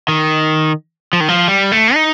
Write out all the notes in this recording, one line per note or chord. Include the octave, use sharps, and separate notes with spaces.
D#3
F3
D#3
F3
G3
A3
D#4